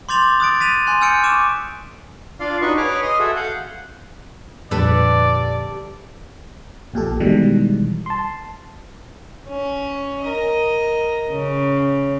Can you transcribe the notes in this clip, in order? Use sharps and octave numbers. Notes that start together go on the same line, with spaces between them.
C6 D6 G6 A6 F7 F#7
D#6 F#6 A6 D7
A6 B6 D#7 F7
G#5 C6 F#6
G#5 E6 F6 G6 C#7 D7
C#6 D6 E7
D4 F4 D5 F5 C6
D4 D#4 F#4 B4 D#5 C#6
G#4 B4 C#5 D6 F6
D#5 C6 D#6 F6
F#4 G#4 A4 E5
F5 F#5 G6
F2 A#2 D3 G3 A4 B4 D5
A#1 A#2 G4 A4
B2 D#3 E3 G3 G#3
A5 C6
C#4
A#4 D#5
C#3